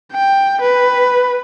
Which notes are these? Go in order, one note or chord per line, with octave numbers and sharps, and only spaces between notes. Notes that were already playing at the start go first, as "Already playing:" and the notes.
G5
B4